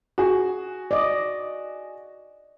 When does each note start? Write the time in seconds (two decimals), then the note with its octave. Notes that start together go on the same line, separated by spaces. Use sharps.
0.18 F#4 G#4
0.91 D5 D#5